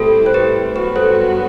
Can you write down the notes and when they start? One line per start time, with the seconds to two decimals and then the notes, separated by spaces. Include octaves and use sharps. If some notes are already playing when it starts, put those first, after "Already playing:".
Already playing: A2 G3 C4 E4 A4
0.26 C5
0.34 G4 B4
0.76 G2 F#3 B3 F#4 G4 B4
0.96 A4 C5